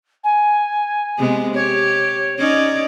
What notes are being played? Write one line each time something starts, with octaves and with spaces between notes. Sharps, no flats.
G#5
C3 G#3 B3
G4 C#5
C#4 D#4 C#5 D5